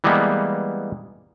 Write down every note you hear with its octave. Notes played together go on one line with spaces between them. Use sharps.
E3 G3 G#3 A#3 B3